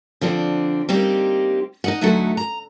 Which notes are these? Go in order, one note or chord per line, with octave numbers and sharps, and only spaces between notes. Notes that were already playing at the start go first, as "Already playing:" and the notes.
D3 F3 C4 D4
G3 A#3 C4 D#4 G4
D#4 D#5 F#5
D2 F#3 A3 D#4 A4 F#5
A#5